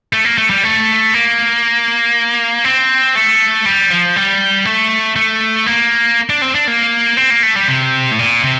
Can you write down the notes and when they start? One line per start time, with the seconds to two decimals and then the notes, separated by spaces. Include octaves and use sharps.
0.13 A3
0.25 A#3
0.38 A3
0.50 G3
0.64 A3
1.14 A#3
2.65 C4
3.15 A3
3.66 G3
3.90 F3
4.16 G3
4.65 A3
5.16 A3
5.66 A#3
6.30 D4
6.42 C4
6.55 D4
6.68 A#3
7.17 C4
7.30 A#3
7.43 A3
7.56 G3
7.68 C3
8.11 A2
8.19 A#2
8.44 C3